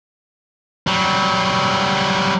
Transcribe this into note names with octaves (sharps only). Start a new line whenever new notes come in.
F#3 G3